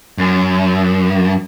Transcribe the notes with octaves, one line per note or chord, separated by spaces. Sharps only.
F#2